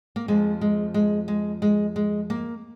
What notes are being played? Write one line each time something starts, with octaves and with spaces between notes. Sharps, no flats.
A#3
F2 F3 G#3
G#3
G#3
G#3
G#3
G#3
A#3